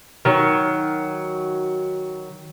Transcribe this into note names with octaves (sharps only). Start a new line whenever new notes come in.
D#3 F#3